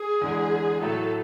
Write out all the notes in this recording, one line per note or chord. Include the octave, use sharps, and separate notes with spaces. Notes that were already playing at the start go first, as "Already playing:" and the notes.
Already playing: G#4
E2 D3 G#3
A2 F#3 A3 A4